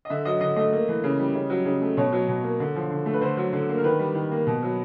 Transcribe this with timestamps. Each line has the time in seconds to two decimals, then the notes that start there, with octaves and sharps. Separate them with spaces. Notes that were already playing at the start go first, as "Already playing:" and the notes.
0.05 D#5
0.10 D3 E5
0.25 F#3 D#5
0.41 D3 D#5
0.56 A3 D#5
0.72 A#3
0.88 E3
1.04 C#3
1.19 G3
1.35 C#3
1.50 F#3
1.66 C#3
1.82 A3
1.97 B2 C#5
2.12 F#3
2.28 B2
2.43 A#3
2.60 D3
2.76 F3
2.91 D3
3.06 A3
3.14 B4
3.21 D3 C5
3.37 F#3
3.53 D3
3.69 A#3
3.78 A#4
3.84 D#3 B4
3.99 G3
4.15 D#3
4.31 A#3
4.47 B2
4.63 F#3